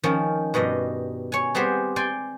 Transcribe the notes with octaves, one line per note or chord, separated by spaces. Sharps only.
D#3 F3 C#4
G2 B2 G3 D#5
C#5 G#5
G3 B3 C4 G4 G#4 C5
D5 G5 G#5 C6